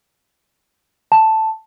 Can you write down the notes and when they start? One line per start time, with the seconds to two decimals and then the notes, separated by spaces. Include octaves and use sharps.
1.12 A5